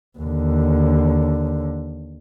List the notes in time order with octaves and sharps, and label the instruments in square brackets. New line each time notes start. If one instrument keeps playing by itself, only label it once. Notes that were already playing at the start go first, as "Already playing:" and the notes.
[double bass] D#2 D3